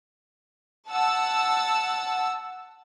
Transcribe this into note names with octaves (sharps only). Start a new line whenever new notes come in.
F#5 A5 E6